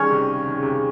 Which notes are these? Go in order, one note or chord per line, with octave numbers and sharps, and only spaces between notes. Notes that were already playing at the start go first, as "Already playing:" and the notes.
Already playing: D#3 G3 C#4 G#4 C#5
C3 D#3
C#3
D#3
C#3
C3
C#3